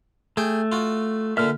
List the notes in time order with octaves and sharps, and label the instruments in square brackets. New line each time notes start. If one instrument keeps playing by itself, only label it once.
[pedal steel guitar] A3 [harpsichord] G#4 G5
[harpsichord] F4 F#4
[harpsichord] A#2 D3 [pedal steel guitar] E5 F6